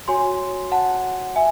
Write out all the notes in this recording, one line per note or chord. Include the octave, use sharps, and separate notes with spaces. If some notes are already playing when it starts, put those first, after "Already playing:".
F#4 C#5 G#5 C6
F#5 A5
E5 G#5